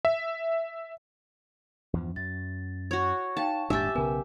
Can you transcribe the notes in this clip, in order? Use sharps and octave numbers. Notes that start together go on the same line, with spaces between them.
E5
E2 G2 F3
F#2 A6
F#4 C#5
D#4 F5 G5 A5
D#1 G#2 D4 G4 E5 G#5 E6 A6
B1 C#3 B3 A#4 B4 G#5